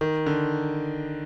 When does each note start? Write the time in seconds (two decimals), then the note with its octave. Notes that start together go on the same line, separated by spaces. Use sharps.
0.01 D#3
0.26 D3